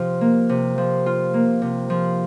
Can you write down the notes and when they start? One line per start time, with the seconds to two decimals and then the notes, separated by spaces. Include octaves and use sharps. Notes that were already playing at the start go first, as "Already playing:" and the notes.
Already playing: C3 F3 F4
0.21 A#3
0.49 C3
0.78 F3
1.06 F4
1.34 A#3
1.62 C3
1.90 F3